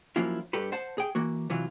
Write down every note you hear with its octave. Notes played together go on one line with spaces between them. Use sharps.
F3 F#3 A#3 C#4 E4 F4
G2 G4 A4 B4
C5 F#5 A5
G#4 G5
E3 A#3 F#4
C3 E3 F#3 F4